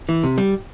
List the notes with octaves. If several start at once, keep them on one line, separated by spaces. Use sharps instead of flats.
E3
C3
G3